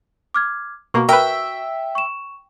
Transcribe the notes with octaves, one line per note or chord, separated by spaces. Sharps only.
D6 F6 G#6
B2 A#3 F#4 C#6
A#4 B4 E5 G5
C#6 E7